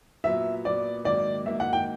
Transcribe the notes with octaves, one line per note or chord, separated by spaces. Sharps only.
A#2 F#3 B3 E5
A#2 F#3 B3 D5
G#2 D#3 F#3 A#3 D5
G#2 D#3 F#3 A#3 E5
F#5
G5